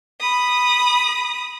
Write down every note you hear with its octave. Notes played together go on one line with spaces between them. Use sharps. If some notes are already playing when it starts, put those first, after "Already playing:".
B5 D#6